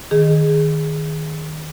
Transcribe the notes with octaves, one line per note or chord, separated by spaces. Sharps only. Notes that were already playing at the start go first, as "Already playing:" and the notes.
D#3 G#4